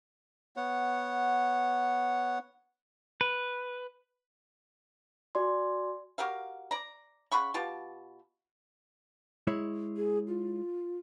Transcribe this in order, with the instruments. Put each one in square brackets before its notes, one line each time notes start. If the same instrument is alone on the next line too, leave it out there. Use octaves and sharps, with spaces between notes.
[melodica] B3 C#5 F#5
[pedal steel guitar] B4
[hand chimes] F#4 D5 G#5 C6
[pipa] F#4 G4 A#4 F5
D5 A#5
C#3 F#5 B5 C#6
B2 F4 G4 A5
[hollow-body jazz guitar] G#3 E4 C#5
[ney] G#4
F4